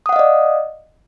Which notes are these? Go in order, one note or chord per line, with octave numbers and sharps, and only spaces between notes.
D5 D#5 F5 F#5 D#6